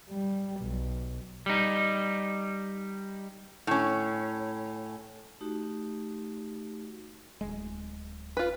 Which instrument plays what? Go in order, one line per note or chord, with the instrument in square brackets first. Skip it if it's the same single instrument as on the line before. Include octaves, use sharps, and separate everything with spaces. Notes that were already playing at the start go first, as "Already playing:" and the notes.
[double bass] G3
B1
[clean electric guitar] G3 D#4
[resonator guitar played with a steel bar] A2 C#4
[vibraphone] A3 D#4 F#4 G4
[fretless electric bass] D1 G1 G#3
[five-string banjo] F4 B4